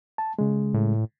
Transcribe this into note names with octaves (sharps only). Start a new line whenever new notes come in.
A5
C#3 G#3
A2